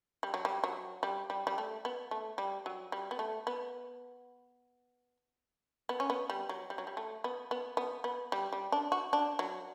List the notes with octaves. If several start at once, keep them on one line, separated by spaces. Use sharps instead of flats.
G3
F#3
G3
F#3
G3
G3
G3
A3
B3
A3
G3
F#3
G3
B3
A3
B3
B3
C#4
B3
G3
F#3
G3
F#3
G3
A3
B3
B3
B3
B3
G3
G3
D4
F#4
D4
F#3